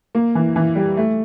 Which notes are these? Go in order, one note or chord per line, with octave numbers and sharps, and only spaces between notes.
A#3
E3
E3
G3
A3